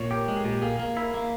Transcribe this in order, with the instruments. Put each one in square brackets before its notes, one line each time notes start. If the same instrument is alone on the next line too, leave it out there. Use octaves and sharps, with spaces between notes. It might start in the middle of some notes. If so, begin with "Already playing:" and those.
Already playing: [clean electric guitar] A#2 [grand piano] C#5
[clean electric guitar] G4 [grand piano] A#4
[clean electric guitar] G#3
[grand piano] G#4
[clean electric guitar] A#2 [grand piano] G4
[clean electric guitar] A#3 [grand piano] G#4
[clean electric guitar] A#3
[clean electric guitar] E4 [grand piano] A#4
[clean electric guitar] A#3